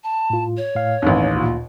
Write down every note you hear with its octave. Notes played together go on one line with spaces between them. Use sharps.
A5
A2 F4
C#5
A2 F5
A1 D#2 C4
D2 A#2 F4